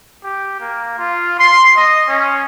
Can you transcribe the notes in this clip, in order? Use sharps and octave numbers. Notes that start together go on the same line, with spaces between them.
G4
A#3
F4
C6
D#5
C#4